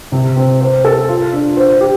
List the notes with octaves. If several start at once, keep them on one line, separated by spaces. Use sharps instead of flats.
C3
C4
C5
A4
F4
D4
C5
G4